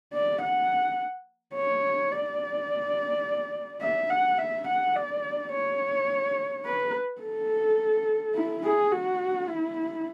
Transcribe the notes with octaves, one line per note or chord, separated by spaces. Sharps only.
D5
F#5
C#5
D5
E5
F#5
E5
F#5
D5
C#5
B4
A4
E4
G#4
F#4
E4